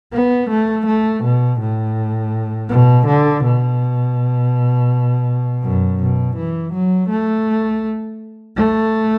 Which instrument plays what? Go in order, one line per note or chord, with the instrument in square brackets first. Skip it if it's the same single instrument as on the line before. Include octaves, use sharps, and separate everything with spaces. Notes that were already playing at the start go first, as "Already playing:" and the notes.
[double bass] B3
A3
A3
B2
A2
B2
D3
B2
F#2
B2
E3
F#3
A3
A3